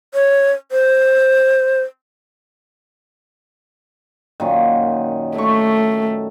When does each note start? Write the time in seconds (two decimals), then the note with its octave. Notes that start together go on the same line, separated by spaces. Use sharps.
0.14 C#5
0.72 C5
4.40 F#2 A#2 D#3
5.38 A3 C#6